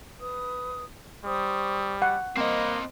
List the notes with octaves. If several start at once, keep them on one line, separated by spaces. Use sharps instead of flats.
B4 D#6
G3 C5 C#6 D#6
F#5
A#3 C4 C5 D#5 C6